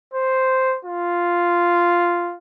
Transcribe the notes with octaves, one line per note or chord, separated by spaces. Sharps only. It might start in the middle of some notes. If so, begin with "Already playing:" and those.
C5
F4